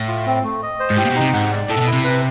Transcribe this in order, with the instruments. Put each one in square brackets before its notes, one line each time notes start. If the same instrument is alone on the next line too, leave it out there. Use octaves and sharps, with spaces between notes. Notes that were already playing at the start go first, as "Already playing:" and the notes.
Already playing: [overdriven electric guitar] A2
[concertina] F4
C4
A3
D#5
C5
[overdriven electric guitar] G#2
[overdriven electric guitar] A2 [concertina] G4
[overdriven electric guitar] A#2
B2
[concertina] D#4
[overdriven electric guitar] C3
[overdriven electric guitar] G#2 [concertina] F#5
[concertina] D5
[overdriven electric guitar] A2 [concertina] A4
[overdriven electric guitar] C3
B2
[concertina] E4
[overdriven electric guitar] C3
[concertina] B4